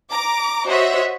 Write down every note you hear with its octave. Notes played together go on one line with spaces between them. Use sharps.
A#5 D6
F#4 C5 C#5 D#5 E5